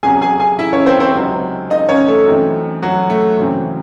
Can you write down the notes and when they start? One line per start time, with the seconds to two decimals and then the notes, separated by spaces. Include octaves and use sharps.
0.03 E1 E2 C3 F#3 C#4 G#4 G#5
0.21 G#4 G#5
0.40 G#4 G#5
0.59 E4 E5
0.73 C#4 C#5
0.86 C4 C5
1.00 C4 C5
1.15 C#2 C3 F#3 C4 D#4
1.70 D#4 D#5
1.89 C#4 C#5
2.08 A3 A4
2.26 F#2 E3 C4 D#4
2.82 F#3 F#4
3.09 A3 A4
3.37 G#1 F#2 C#3 E3 C4